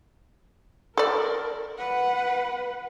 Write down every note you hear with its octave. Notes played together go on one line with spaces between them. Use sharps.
A4 A#4 D5
B4 F#5